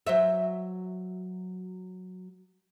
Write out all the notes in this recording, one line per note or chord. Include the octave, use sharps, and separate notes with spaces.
F#3 C5 E5